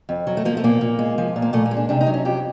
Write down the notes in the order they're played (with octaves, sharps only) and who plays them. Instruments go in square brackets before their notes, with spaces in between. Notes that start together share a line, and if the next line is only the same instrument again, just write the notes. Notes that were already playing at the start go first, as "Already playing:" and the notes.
[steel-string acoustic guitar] F2
F#3
A3
F3 A#3
A3
A#2 A#3
A#2
G#3
F3
A#2
A#3
A#2 A3
A#3
G#3
D4
C3 D4
D#4
F#3
C#4
F2 G4